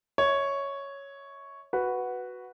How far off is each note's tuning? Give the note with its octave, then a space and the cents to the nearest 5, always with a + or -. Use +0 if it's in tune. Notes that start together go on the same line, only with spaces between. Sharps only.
C#5 +0 E5 -40
F#4 +0 B4 +0